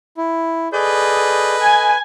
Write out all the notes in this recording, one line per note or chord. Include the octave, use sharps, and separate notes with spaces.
E4
G#4 A4 B4 D5 D#5 G6
G#5